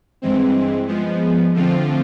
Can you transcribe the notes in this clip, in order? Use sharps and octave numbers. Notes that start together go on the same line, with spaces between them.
G2 E3 G#3 C4
F3 G#3 B3
D3 F3 A3 C4 F4